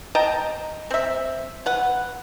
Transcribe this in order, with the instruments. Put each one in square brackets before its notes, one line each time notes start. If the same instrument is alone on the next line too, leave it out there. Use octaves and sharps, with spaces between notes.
[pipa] D#5 G5 A5 A#5
C4 E5
B4 F#5